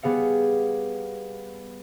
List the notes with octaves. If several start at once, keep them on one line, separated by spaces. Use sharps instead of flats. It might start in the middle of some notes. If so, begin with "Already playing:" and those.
G3 B3 G#4 F5 C#7